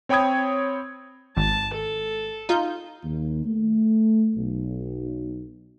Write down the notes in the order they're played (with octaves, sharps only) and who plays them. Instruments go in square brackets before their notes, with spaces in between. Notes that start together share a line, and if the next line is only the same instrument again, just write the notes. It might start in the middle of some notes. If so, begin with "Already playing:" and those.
[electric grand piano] C4 C#5 G5 B5 D#6 G#6
[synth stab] G#1 [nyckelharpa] A5
[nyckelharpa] A4
[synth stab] D#4 F4 G6
[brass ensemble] D#2
A3
B1